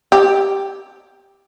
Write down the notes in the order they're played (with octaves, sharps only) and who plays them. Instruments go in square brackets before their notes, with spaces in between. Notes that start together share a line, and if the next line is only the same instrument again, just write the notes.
[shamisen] G4